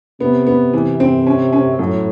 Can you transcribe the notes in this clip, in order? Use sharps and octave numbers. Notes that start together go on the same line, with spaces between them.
C3 B3
B3
E3
C4
C#4
C#4
F#2 A2